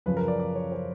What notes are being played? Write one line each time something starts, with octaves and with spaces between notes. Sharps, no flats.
F#2 C#3 F3 B4
A#4
D5
D5
C#5
C5